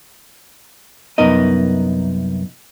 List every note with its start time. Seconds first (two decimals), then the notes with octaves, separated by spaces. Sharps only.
1.18 C2 F#2 B3 D#4 A#4 D#5